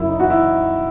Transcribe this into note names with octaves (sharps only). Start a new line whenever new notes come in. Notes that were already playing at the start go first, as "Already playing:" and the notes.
Already playing: F#2 C#3 F#3 E4
D#4
F#4
E4